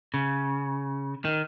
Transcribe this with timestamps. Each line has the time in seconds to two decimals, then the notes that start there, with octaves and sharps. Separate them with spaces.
0.14 C#3
1.25 D#3